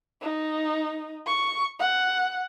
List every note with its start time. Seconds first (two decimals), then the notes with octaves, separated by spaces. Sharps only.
0.22 D#4
1.27 C#6
1.80 F#5